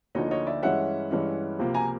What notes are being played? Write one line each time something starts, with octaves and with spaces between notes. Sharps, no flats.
D2 D3 F3 A#3 D#4 C#5 D#5
C#5 D#5
D5 E5
G2 E3 G#3 C#4 E5 F#5
G2 E3 G#3 C#4
C#2 C3 F3 A#3
G#5 A#5